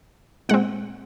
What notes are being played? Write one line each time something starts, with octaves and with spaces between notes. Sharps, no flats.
A#2 G#3 C4 F#5